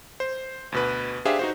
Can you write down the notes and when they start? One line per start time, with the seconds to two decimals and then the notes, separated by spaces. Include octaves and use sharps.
0.20 C5
0.72 D2 B2 B4
1.25 D4 G4 G#4 C5 E5 F5
1.39 D#4 F#4 C5